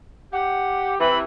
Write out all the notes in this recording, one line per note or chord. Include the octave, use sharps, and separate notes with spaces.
G4 F#5
C3 E3 B5